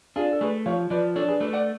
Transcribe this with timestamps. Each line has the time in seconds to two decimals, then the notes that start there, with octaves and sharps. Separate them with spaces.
0.16 D4 F4 G#4
0.32 A4
0.41 A3 G#4 B4
0.66 F3 C#5 F5
0.90 F3 B4 D5
1.15 D4 A4 C#5
1.28 G#4 B4
1.41 A3 B4 D5
1.53 D5 F#5